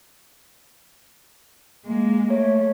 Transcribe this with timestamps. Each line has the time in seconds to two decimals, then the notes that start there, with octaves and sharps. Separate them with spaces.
1.85 G#3 A#3
2.30 A3 C#5